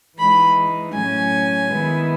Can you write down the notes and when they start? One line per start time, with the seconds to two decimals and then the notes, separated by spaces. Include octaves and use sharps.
0.17 E3 G#3 D#4 B5
0.94 A2 F#3 C#4 G#5
1.70 D#3 G#3 B3 E4